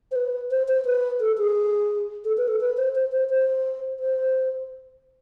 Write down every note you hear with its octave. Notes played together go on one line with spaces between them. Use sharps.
C5
B4
C5
C5
B4
A4
G#4
A4
B4
A4
B4
C5
C5
C5
C5
C5